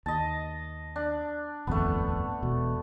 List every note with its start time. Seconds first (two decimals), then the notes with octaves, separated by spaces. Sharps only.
0.06 D#2 D#5 A5
0.96 D4
1.67 D#1 G#1 F2 A3 B3
2.42 E1 B2